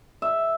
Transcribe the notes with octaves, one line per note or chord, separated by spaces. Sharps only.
E5